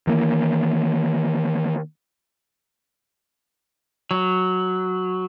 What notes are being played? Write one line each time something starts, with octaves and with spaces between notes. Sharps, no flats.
D#3 E3 A#3
F#3